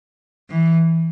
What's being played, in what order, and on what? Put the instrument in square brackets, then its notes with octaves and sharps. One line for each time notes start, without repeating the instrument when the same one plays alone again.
[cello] E3